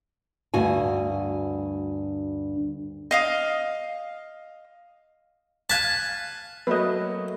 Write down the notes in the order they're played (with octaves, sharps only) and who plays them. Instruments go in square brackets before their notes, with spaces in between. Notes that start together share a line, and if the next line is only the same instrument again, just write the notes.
[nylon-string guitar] D2 G2 F#4 G#5
[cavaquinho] D#5 F5 D#6
[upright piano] F5 F#6 B6 [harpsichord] G#5 A5
[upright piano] F#3 A3 A#3 [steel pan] B4 D#5